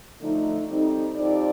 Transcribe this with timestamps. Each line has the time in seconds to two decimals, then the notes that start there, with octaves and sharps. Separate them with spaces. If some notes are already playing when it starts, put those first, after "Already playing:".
0.21 D3 F3 A3 D#4
0.69 G3 C4 D#4 A4
1.16 F3 C4 D#4 G4 D5